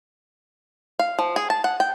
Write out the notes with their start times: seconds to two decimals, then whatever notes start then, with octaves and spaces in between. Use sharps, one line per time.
0.99 F5
1.19 F3
1.36 G#4
1.50 A5
1.64 F#5
1.80 G5